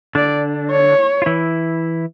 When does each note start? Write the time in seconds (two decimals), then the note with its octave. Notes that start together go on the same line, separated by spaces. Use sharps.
0.15 D3 D4 D5
0.71 C#5
1.22 F4
1.26 E3 E4